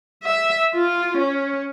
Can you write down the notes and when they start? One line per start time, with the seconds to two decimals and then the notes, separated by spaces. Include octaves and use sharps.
0.23 E5
0.74 F4
1.17 C#4